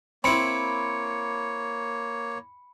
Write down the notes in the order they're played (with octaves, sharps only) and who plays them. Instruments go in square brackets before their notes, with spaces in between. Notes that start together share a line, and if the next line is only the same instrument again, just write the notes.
[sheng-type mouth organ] A#3 C#5 [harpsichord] C4 E4 [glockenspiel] B5 C#7